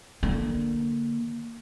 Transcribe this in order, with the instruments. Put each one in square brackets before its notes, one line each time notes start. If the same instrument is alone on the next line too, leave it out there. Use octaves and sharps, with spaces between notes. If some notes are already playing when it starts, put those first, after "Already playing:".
[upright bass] D3 A#3